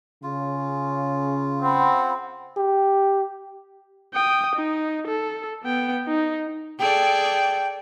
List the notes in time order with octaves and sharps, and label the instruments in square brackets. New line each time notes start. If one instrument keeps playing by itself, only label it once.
[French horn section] C#3 [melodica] F4
[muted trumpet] C4 [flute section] F#5 B5
[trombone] G4
[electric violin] G5 D#6
D#4
A4
B3 G5
D#4
[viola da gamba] G#4 A4 D5 [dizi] G5